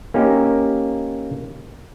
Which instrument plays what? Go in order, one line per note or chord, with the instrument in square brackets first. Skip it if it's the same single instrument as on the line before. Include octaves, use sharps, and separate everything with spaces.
[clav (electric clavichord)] A#3 C#4 D#4 G4